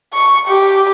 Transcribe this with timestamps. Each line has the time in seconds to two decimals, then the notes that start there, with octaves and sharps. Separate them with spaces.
0.14 C#6
0.48 G4